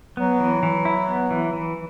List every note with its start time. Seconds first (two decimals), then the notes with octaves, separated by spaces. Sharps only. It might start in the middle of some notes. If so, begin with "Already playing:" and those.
0.17 F#3 B3
0.40 E3
0.63 E3
0.85 E4
1.08 B3
1.31 E3
1.53 E3